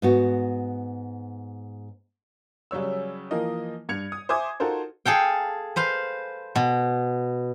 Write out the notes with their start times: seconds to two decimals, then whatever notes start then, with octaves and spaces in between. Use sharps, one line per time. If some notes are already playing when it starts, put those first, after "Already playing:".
0.02 G#2 B3 F#4
2.71 C#3 F#3 G3 C#5 E6
3.31 E3 F3 A#3 A#4 D#5
3.89 G2 G#6 C#7 F7
4.12 D#6
4.29 C5 E5 G#5 D6 D#6 G#6
4.60 D#4 F4 F#4 A4 A#4 C5
5.06 G#4 A4 F5 G5
5.76 B4 C5 F5
6.56 B2